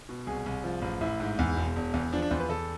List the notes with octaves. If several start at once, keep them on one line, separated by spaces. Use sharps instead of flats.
B2
C2 G#4
C2
F3
A1
A1 E4
G#2
E2
E1
E1
E2
F3 D4
D4
E2 C5
B4
E2 A4